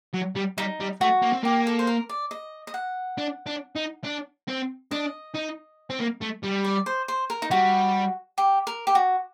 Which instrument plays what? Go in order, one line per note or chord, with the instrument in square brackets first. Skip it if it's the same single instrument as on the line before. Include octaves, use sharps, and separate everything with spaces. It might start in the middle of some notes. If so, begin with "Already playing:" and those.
[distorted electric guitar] F#3
G3
[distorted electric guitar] G3 [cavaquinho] D#4
[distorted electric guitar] G3
[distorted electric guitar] A3 [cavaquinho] F#4
[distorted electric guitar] A#3
C4
[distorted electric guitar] A#3 [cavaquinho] G4
[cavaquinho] A4
C5
A#4
D5
D#5
D#5
F#5
[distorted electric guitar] D4
D4
D#4
D4
C4
[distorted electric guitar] D4 [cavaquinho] D#5
[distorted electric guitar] D#4
C4
A#3
A3
G3
[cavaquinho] D5
C5
C5
A#4
D#4
[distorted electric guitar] G3 [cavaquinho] F#4
[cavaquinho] G4
A#4
G4
F#4